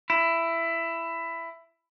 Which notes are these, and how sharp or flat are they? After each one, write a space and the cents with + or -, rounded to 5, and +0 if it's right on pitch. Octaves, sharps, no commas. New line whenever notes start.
E4 +15